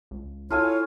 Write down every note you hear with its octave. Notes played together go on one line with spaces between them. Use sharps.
C#2
E4 F4 A4 C#5 G#5